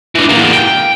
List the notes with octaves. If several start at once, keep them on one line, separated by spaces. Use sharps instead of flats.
E3 D4
E2 A#3
G5